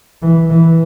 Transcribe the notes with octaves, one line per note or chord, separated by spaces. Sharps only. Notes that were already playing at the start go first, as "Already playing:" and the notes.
E3
E3